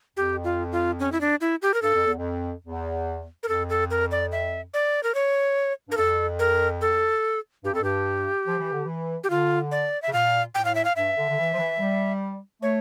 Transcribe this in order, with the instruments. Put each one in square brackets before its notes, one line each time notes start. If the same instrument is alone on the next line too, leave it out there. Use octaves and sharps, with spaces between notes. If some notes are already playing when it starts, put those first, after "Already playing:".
[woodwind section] F2 [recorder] G4
[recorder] F4
F4
C#4
E4
D4
E4
G4
A#4
[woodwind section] G2 [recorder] A4
[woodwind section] F2
E2
F2
E2
[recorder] A#4
[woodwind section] F2 [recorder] A4
[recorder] A4
A#4
D5
E5
D5
A#4
C#5
[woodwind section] G2 [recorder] A#4
[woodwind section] F2 [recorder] A4
[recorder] A#4
A4
[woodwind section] G2 [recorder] G4
[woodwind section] F2 [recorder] A4
[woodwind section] G2 [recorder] G4
[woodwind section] F3
E3
D3
E3
[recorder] G4
[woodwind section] D3 [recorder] F4
[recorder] D5
E5
[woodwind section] C#3
[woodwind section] A#2 [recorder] F5
[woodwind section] A2 [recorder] G5
[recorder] F5
E5
F5
[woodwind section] G2 [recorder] E5
[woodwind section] D3
D3
E3
F3
E3
G3
[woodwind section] A3 [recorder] C#5